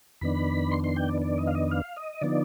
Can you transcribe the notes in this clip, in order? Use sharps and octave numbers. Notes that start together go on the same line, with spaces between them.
F2 D#3 B3 D4 B5
C6
C6
G5
D5
D5
D#5
F5
D#5
F5
D#5
D3 F3 B3 D#4 D5